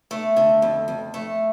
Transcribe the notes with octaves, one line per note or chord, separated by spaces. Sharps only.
A3
D3
F2
F2
A3